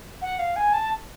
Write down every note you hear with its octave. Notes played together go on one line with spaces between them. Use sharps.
F#5
F5
G#5
A5